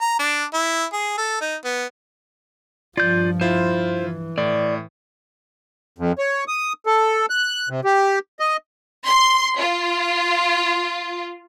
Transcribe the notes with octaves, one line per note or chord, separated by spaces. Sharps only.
A#5
D4
E4
G#4
A4
D#4
B3
G2 F3 F4 D5 G6
E4 F4 C5
E3
A2 D5
F2
C#5
D#6
A4
F#6
C3
G4
D#5
C6
F4